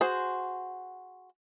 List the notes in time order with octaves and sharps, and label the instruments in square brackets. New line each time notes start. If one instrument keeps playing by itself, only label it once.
[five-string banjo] F#4 G#4 C5